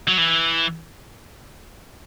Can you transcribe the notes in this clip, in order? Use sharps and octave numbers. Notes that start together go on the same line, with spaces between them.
F#3
E3